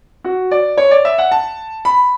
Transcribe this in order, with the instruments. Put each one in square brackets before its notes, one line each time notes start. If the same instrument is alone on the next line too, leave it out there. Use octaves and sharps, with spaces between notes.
[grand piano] F#4
D5
C#5
D5
E5
F#5
A5
B5